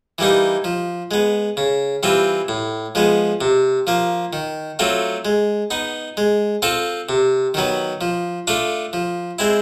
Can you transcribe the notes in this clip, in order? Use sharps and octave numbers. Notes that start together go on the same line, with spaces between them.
E3 G3 A#3 D#4
F3
G#3 B3
C#3
E3 G3 C4 F4
A2
F3 G#3 B3
C3
F3 A#3
D#3
F#3 A3 C4 F4
G#3
B3 D#4
G#3
C4 F4 A4
C3
D#3 F#3 B3
F3
A3 D4 F4
F3
G#3 C4 E4